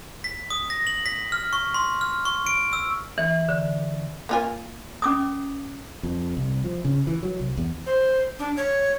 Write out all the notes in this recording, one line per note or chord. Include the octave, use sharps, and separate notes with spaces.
B6
D#6
A#6
F#7
B6
F6
C#6
C6
F6
C#6
D7
E6
E3
D3
A#3 F4 G#5
C#4 D6 D#6
F2
C2
F3
C#3
E3
F#3
C2
E2
C5
D4
C#5